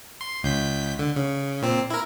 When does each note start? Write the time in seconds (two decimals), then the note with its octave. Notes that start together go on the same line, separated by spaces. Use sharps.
0.21 C6
0.44 C#2 G6 B6
0.99 D3
1.16 C#3
1.62 A#2 C4
1.90 E4 A#4